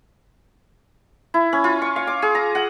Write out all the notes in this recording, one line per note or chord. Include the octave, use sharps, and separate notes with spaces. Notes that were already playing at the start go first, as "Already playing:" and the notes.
E4
C#4
F4
C#6
F5
D6
G#4
A#5
F#5